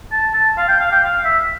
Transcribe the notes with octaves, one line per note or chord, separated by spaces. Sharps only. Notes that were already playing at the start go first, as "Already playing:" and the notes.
A5
A5
F5
G5
F5
G5
F5
E5